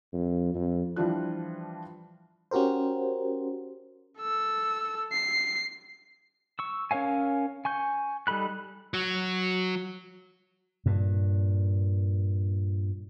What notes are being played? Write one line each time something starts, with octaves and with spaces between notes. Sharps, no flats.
F2
F2
E3 F3 G3 D4 F4 F#6
C#4 F#4 G4 A#4 C5
A4 E6
C7
C#6 E6
C#4 A#4 C#5 F5 G#5
G#5 C#6 G6
G3 D#4 A4 B5 F#6
F#3
G2 A#2